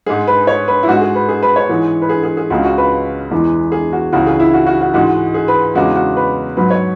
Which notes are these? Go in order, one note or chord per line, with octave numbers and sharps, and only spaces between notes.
G#2 G#3 G#4
B4
C#5
B4
E4
G#2 G#3 F#4
G#4
B4
G#4
B4
C#5
G#2 E3 G#3
B4
G#4
G#4
G#4
C#2 C#3 G#3 F#4
F#4
B4
E2 E3 G#3
G#4
F#4
C#2 C#3 E3 F#4
G#4
E4
F#4
F#4
F#4
G#2 E3 G#3 F#4
G#4
B4
E2 C#3 G#3 F#4
F#4
B4
G#2 F#3 B4
C#5